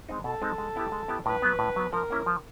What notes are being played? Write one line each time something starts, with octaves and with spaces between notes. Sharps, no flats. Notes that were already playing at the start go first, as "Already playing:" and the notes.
G#3 C4 D#4
B2 A4
G#3 C4 D#4
G#3
B3 E4 G4
G#3
B3 E4 G4
A2 B4
F#3 B3
A2
F#3 B3
F3 A#4
A#3 C#4 E4
F3